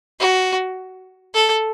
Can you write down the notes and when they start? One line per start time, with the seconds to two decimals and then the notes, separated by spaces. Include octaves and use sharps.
0.19 F#4
1.34 A4